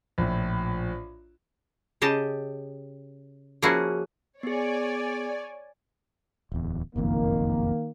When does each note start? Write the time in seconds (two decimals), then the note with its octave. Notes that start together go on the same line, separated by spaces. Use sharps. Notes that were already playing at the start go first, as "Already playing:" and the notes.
0.18 A#1 A2
2.02 C#3 G4 D#5 A5
3.62 F3 A#3 C#4 E4 F#4 G#4
4.43 B3 G#4 C#5 D5 G#5
6.52 D1 E2
6.96 F#1 B1 F2 D#3 A#3